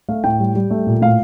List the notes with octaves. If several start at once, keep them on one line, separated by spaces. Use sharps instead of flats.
A3 F5
A2 G5
G3
G3
A3
A#2
A2 F5